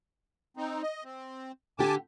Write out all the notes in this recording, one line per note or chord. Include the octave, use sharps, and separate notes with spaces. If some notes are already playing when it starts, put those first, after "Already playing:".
C4 D#4
D#5
C4
D3 G4 G#5 A5 D6